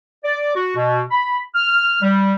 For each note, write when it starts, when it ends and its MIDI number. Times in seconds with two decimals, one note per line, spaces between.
0.24 0.55 74
0.56 0.75 66
0.76 1.01 47
1.11 1.39 83
1.55 1.99 89
2.02 2.35 55